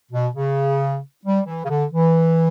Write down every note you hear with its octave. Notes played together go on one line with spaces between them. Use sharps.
B2
C#3
G3
E3
C#3
D3
E3